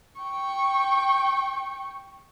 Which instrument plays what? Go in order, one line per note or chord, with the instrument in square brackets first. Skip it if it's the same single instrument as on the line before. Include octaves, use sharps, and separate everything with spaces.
[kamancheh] G5 C#6